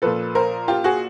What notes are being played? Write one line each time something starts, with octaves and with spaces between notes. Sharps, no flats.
A#2 F3 A4 B4
A#4 C5
F4 G4
F#4 G#4